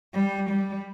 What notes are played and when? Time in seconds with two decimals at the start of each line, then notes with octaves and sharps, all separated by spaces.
0.14 G3
0.50 G3